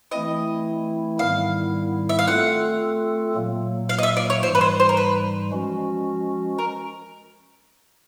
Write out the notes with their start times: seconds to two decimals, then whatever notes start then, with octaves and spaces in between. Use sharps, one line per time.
0.11 E3 A3 C4 E4 D#5
1.19 G#2 D#3 G3 B3 E4 F5
2.09 E5
2.19 F5
2.27 A3 C4 F4 A4 F#5
3.35 A#2 F#3 A#3
3.89 F5
3.98 D#5
4.03 E5
4.17 D5
4.30 C#5
4.43 G#2 E3 G3 C5
4.55 B4
4.61 C5
4.80 C5
4.89 A#4
4.97 B4
5.51 F3 G#3 C#4 F#4
6.58 A#4